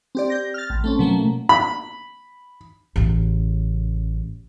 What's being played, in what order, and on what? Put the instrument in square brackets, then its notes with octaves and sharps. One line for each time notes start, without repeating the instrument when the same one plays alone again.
[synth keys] C4 G4 D5
G6 A#6
F6 A6
A1
A3 C4 C#4
B2 F#3 A3 A#3
[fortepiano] B5
[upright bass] A1 C#3